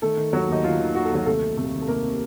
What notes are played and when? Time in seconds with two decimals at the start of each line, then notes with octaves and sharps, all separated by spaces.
0.02 D#3 A3 A4
0.17 D#3
0.33 D#2 F#3 F#4
0.49 D#2 D#4
0.64 D#3 F4
0.80 D#3
0.95 D#2 F#4
1.05 A4
1.11 D#2 F#3 F#4
1.26 C2 A3 A4
1.42 C3
1.57 C2 A3 A4
1.73 D#3
1.82 A4
1.88 C2 A#3 A#4
2.04 C3